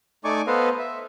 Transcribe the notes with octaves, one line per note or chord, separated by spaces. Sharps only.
A3 D#4 D5 G#5 C#6 D6
B3 A4 B4 C5 D#5 F5
E5